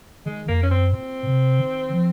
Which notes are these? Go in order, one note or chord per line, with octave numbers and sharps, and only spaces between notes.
D#3 G#3
F2 A#3
C#4
F#2 C4
A#2 C4
C3
D#3
F3